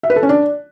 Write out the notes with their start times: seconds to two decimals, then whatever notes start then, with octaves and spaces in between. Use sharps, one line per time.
0.03 E5
0.10 B4
0.16 A4
0.23 C#4
0.29 D4